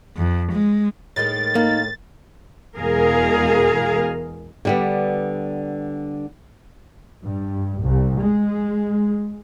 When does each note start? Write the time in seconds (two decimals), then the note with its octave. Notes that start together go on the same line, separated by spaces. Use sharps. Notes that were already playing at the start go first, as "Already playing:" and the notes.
0.16 F2
0.52 G#3
1.16 A2 D#3 G#3 A6
1.55 A#3 D#4
2.77 E2 B2 G#3 G#4 A#4 F5
4.65 D3 G3 B3
7.24 G2
7.82 C2
8.20 G#3